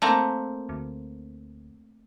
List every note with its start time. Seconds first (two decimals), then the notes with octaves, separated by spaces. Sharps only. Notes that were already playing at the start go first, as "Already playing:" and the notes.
0.02 A3 A#3 C4
0.69 D2